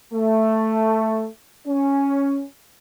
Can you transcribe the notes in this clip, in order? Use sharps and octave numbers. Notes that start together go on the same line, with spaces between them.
A3
C#4